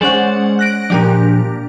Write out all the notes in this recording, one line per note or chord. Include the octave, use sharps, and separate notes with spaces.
G#3 C#4 C5 D5 F#5
F#6 A#6 D7
A#2 F3 D4 G4 A#4